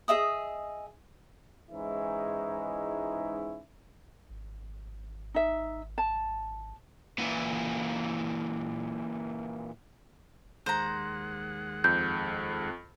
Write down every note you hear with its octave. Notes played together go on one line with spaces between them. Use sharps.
G#4 D#5 E5 D#6
G#2 E3 G#3 C#4 D#4 E4
G#1
D#4 E5
A5
A#2 E3
D#2 G#3 C5 F#5 A#5
F2 G6